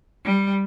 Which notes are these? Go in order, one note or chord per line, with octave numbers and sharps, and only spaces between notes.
G3